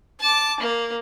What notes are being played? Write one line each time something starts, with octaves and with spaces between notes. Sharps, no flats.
A5 D6
A#3